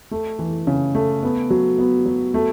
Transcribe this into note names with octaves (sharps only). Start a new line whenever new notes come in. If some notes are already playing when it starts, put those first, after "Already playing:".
A3
E3
C#3
A3
B3
F#3
B3
F#3
A3